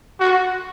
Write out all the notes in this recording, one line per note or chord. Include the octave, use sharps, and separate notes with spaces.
F#4